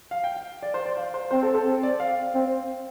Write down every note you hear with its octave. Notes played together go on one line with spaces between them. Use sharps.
F5
G5
F5
D5
C5
D5
F5
C5
C4 C5
A4
A4
C4
D5
F5
C4